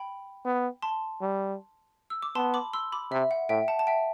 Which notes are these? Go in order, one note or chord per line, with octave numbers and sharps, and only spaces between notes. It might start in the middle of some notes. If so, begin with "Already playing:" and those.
Already playing: G5 B5
B3
A5 C6
G3
E6
D6
B3 A5 C6
B5 D6
C6 E6
B5 D6
C3 E5
F#5
A2 E5 G5
F#5 A5
A5
E5 G5